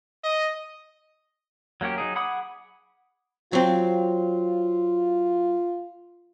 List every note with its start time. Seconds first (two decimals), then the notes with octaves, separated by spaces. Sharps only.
0.24 D#5
1.81 F#3 A#3 C#4 G4
1.98 F#3 D#4 G#4
2.16 G#4 F#5 B5 D6 D#6
3.53 F#3 C4 F4